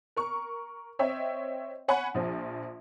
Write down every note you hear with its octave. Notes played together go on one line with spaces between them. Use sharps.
A#4 C#6
C4 C#5 D#5 E5 G5
C#5 F#5 G#5 B5
A#1 F3